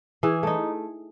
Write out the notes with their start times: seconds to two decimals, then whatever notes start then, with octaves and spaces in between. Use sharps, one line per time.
0.23 E3 G#4
0.43 A3 D#4